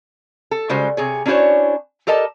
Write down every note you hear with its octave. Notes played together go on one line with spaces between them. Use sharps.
A4
C#3 G3 G#3 F#4 C5
C3 G#4 C#5
C#4 D4 E4 F#4 C5 C#5
G4 A4 A#4 D#5 A5